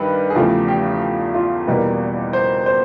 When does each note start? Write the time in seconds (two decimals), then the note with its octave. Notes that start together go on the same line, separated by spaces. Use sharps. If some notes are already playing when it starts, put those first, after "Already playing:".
Already playing: G2 D#3 G3 B4
0.30 G#4
0.35 E2 C#3 F3 A3 G4
0.68 G4
1.01 G4
1.34 F4
1.67 E2 B2 G3 A#3 B4
2.33 C5
2.66 C5